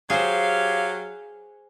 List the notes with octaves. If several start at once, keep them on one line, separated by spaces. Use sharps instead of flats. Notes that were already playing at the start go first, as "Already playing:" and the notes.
F#3 G4 G#4 C5 F5